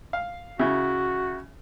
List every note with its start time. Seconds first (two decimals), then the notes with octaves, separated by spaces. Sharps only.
0.13 F5
0.59 C#3 E4 F#4